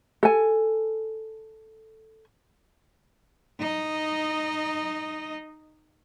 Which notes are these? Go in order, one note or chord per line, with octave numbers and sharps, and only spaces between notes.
A4 G#5
D#4 D#5